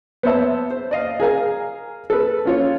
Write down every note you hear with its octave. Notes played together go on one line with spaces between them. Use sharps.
B3 C5 C#5 E5 A5
C5
D5 D#5 F5
G#4 A#4 F5 G#5
A4 B4
C#4 F4 C#5